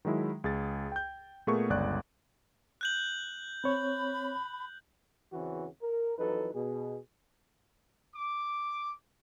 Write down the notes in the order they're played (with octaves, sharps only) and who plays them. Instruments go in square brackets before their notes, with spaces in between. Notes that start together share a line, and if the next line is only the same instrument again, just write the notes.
[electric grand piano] D#3 F#3 G#3 E4
C#2 G#4 A6
G5 G6
A#2 A3 B3 G#4 A#4 C#6
G1 C#2 D5 F#6
[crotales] F#6 G6 F#7
[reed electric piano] C4 C#5 [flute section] B5
[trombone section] E2 C#3 E3 C4 C#4 F#4
A#4
F2 E3 F#3 D#4 A4 B4
B2 G#4
[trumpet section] D6